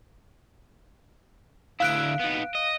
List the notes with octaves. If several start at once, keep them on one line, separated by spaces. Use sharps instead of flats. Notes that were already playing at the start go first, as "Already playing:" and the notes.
D2 E4 F5 F#6 D7
B3 D#4
D#5